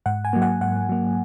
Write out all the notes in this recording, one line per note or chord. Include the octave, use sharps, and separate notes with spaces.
G#2 F#5
G#5
F#3 A#3
F#5
G#2 F#5
F#3 A#3